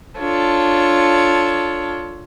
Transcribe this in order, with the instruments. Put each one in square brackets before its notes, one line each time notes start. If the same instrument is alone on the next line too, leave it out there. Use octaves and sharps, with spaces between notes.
[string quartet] D4 F4 A4 C#5